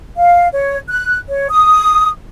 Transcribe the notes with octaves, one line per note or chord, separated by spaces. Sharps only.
F5
C#5
F#6
C#5
D#6